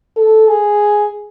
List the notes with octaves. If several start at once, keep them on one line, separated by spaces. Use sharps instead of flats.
A4
G#4